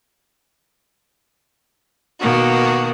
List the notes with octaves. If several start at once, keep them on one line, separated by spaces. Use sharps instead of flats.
B2 D#3 A#3 F#4